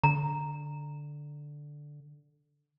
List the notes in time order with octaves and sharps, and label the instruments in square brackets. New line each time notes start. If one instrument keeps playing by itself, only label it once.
[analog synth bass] D3 [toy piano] A#5